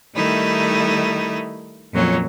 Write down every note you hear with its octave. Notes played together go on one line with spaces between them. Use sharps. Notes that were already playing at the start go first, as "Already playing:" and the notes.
D#3 G3 A3 D#4 E4
F2 A#2 F#3 C#4